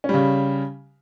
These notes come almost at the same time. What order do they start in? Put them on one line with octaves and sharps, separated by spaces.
C#4 G3 C#3